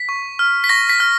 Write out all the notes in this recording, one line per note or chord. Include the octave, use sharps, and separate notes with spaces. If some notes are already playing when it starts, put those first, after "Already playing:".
Already playing: B6
C#6
F6
B6
C#6 A#6
B6
F6